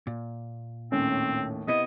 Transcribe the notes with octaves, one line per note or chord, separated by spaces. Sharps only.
A#2
D#2 A2 C4 C#4
C3 B3 E4 D#5